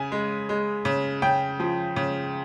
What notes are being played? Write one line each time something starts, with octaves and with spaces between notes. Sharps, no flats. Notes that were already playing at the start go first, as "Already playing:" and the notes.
Already playing: C#3 G#5
G#3
G#3
C#3
C#3 G5
F3
C#3